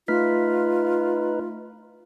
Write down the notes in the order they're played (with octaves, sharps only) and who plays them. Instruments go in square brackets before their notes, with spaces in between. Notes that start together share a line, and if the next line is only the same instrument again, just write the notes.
[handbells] A3 F6 B6 [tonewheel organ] D#4 B4 [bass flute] F4